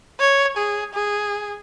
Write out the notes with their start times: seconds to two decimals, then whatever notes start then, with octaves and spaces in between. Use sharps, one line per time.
0.20 C#5
0.57 G#4
0.94 G#4